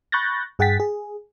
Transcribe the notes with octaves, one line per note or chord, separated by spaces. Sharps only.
B5 C#6 F#6 G6 A6 A#6
G2 G#4 F#5 G5 A6 B6
G#4